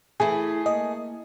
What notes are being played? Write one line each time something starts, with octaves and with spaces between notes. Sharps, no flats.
E3 A3 E4 G#4
A#3 D#5